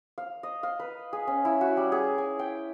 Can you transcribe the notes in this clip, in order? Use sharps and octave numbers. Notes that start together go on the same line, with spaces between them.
F5
D#5
F5
B4
G#4
C#4
E4
F#4
G3
G#4
G#5
G5